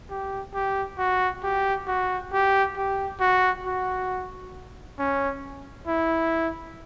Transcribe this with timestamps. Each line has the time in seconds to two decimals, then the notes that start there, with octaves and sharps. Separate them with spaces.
0.10 G4
0.54 G4
0.98 F#4
1.43 G4
1.88 F#4
2.32 G4
2.76 G4
3.20 F#4
3.66 F#4
4.99 C#4
5.87 E4